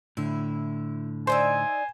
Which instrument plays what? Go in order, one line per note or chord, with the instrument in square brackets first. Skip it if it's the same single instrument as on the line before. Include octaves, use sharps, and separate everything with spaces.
[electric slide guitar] A2 D3 [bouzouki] E4
[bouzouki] D#4 D5 E5 [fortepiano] C5 [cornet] G#5